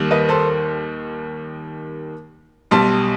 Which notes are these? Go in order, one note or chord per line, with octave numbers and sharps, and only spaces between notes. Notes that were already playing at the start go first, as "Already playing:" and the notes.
Already playing: D#2 D#3 G3
B4 D#5
A4 C5
B1 B2 G3 A5 C6